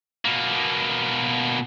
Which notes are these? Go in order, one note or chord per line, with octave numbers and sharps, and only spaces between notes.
B2 A#3